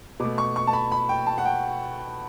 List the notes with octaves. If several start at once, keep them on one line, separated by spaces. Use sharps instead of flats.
B2 A3 D6
C#6
C#6
A5
B5
B5
G5
A5
F#5
G5